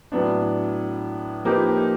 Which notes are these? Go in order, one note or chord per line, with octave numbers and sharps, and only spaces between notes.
A2 F#3 B3 D4
F3 A#3 D#4 G4 B4